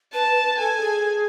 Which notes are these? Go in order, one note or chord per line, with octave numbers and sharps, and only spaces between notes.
B4 A5
B4
A4 G#5
G#4